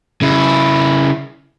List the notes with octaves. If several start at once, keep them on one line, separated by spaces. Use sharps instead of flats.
C#3 E4